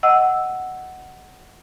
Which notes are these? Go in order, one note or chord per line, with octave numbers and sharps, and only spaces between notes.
D#5 F#5 E6